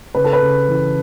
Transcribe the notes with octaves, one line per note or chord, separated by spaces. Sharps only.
C#3 B4
A4
B4
C#3
E3